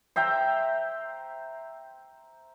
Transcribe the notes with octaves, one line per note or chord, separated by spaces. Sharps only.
C5 E5 G5 A#5